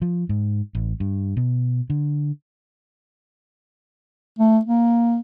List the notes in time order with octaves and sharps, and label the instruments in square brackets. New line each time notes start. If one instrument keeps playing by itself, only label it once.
[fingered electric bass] F3
G#2
A1
G2
B2
D3
[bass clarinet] A3
A#3